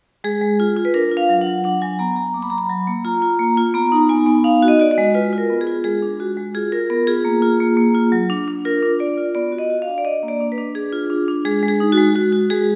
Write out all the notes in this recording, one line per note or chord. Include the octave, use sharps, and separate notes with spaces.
G#3 G#4
G#3
F4
F4
B4
D4 A#4
F4
F5
F#3
F#5
F#3
D4 F#5
F#3 G#5
B3 A#5
F#3 A#5
A#3 D6
B5
F#3 A#5
B5
F#3
A#3
F4 A#5
F4
A#3
F4
B3 A#5
D#4
B3 G#5
B3
D#4 F5
F#4
D#5
F#4 D5
D#5
G#3
F4 B4
F4
A#4
B3
G#4
F4
G#3 G#4
D4
G#3 F#4
G#3
F4 G#4
F4 A#4
B3 A#4
F4 G#4
A#3
F4
A#3
A#3
F4
F#3
D4
D4
F4 A#4
D4
F4 D5
F4
B3 D5
F#4
D#5
F#4
F5
D4
D5
D4 D#5
A#3
D5
D4
B4
D4
D4 G#4
F4
D4
D4
G#3 G#4
G#3
G#4
D#4
F#4
G#3
G#3 F#4
F#4
G#3 G#4